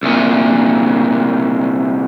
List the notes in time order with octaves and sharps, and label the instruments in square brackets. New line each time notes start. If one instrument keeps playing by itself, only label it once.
[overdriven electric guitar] C2 A#2